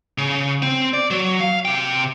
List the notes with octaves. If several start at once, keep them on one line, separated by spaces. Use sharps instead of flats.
C#3
C4
D5
F#3
F5
C3 G5